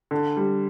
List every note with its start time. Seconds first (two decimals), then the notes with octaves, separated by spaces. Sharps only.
0.11 D3
0.37 G3